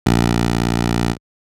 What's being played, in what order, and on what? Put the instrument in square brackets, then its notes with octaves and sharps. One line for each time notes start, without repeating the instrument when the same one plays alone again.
[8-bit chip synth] A#1